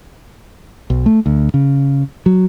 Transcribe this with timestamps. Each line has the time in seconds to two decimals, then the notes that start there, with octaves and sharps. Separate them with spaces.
0.90 B1
1.06 A3
1.26 D2
1.54 C#3
2.26 F#3